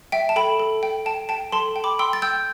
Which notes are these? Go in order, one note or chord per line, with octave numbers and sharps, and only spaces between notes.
E5 G5
A5
A4 G5 B5
A4
G5
G5 A5
G5 A5
A4 A5 C6
G5
B5 D6
G5 C6 E6
A6
G5 E6 G6